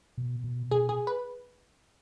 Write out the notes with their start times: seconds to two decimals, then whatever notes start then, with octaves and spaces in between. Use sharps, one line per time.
0.18 B2
0.44 B2
0.71 B2 G#4
0.89 G#4
1.07 B4